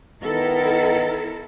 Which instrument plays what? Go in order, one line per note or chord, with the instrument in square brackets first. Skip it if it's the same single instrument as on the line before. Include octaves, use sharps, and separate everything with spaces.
[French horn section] D#3 B3 [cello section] E4 A4 A#4